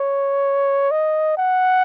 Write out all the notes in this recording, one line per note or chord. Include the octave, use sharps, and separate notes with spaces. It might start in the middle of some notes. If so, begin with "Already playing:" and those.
Already playing: C#5
D#5
F#5